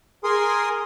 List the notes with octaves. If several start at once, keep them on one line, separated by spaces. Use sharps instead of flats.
G#4 A#4 G#5 C6 D#6